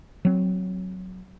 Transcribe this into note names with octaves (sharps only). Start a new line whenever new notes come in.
F#3 C4